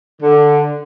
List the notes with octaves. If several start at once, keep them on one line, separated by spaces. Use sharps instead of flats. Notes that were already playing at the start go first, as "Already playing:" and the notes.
D3